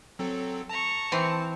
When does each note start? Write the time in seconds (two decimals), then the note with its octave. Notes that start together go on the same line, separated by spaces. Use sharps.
0.19 F#3 C4 A4
0.69 A5 A#5 C#6
1.12 E3 C4